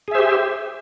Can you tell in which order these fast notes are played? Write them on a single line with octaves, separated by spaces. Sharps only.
G#4 E5 C5 G4